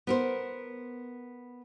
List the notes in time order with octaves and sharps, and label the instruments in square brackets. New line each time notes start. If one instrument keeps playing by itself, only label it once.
[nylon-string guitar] B3 A#4 C5